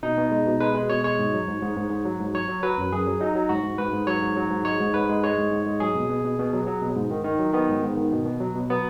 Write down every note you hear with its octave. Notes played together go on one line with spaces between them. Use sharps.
B2 D#4
B2
G#3
B2
G#3 B4
G#3
B2 C#5
G#3 C#5
G#2
F#3
G#2
G#2
G#2
G#2
F#3
G#2
F#3 C#5
F#3
F#3 B4
F#2
F#2 G#4
F#3
F#3 D#4
F#3
G#2 F#4
G#2
G#2 B4
G#2
F#3 C#5
G#2
F#3
G#2
G#3 C#5
G#2
G#2 B4
G#3
G#3 C#5
G#2
G#2
G#3
F#3 G#4
B2
B2
B2
B2
F#3
F#3
B2
G#2
D#3
D#3
F#3
D#3 B3
G#2
G#2
D#3
B2
B2
F#3
B2
F#3 B3